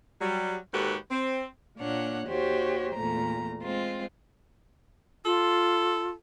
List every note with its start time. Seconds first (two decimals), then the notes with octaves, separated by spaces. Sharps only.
0.21 F#3 G3
0.73 D#2 G#2 F#4 G4 A4 B4
1.11 C4
1.77 A#2 A#3 D4 C#5 F#5
2.28 D#2 F#4 G4 C5 C#5
2.93 E2 A#2 A3 A#5
3.63 G#3 C4 F4
5.25 F4 A4